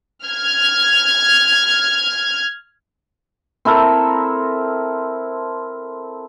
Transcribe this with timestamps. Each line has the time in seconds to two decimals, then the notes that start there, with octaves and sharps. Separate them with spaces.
0.25 F6 G#6
3.65 C4 E4 A4 A#4